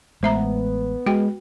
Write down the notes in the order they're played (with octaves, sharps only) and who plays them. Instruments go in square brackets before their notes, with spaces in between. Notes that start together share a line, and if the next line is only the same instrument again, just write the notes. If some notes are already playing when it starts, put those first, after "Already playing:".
[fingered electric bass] A1 G#3 A3 [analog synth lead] B3 [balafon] C5 E5 A#5
[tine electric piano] G#3 [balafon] F#4 G5